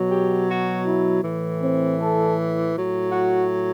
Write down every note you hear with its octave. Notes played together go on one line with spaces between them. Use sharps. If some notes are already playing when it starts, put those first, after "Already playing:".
Already playing: B2 F#3
G4
F#4
E4
A2 E3
C4
A4
A2 F#3
F#4